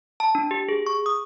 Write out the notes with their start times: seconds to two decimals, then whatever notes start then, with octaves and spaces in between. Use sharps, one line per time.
0.20 A5
0.35 D4
0.51 G4
0.69 G#4
0.86 C#6
1.06 D#6